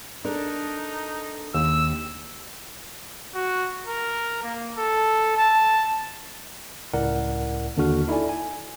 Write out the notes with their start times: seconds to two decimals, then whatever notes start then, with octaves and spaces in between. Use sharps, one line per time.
0.24 D4 D#4 A4 A#4
1.54 D#2 G4 E6
3.35 F#4
3.87 A#4
4.44 A#3
4.78 A4
5.37 A5
6.94 C#2 A2 E4 A#4 D5 F#5
7.77 D#2 D3 D4 F#4 F6
8.08 D#4 E4 A4 D5 G#5
8.29 G#5